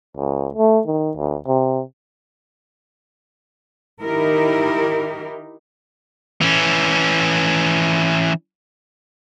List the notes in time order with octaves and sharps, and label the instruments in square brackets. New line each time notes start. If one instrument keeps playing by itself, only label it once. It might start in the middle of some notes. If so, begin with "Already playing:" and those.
[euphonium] C#2
A3
D#3
D2
C3
[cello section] D#3 D#4 E4 G4 A#4
[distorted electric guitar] E3 C#4